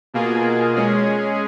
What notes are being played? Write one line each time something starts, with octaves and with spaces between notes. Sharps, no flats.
B2 A#3 F4 G#4
G#3 C#4 G#4